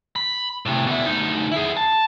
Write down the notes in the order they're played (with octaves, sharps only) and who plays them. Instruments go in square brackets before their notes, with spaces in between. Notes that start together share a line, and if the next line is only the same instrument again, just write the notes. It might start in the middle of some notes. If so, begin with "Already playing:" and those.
[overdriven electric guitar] B5
A2 C3
B2 E4
D2 D#4
E4 G#4
A5